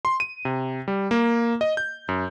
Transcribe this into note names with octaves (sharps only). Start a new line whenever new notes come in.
C6
D#7
C3
G3
A#3
D#5
G6
F#2